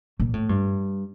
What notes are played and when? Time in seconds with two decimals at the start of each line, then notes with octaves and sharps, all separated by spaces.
0.20 A#2
0.34 A2
0.49 G2